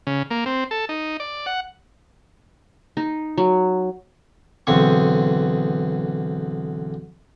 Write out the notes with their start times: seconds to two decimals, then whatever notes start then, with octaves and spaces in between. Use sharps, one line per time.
0.07 C#3
0.30 A#3
0.46 C4
0.71 A4
0.89 D#4
1.20 D5
1.46 F#5
2.97 D#4
3.38 F#3
4.67 B1 E2 D3 C4 C#6